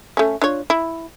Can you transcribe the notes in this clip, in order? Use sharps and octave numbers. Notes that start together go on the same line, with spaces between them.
A3 C#4
D4 F4 C#5
E4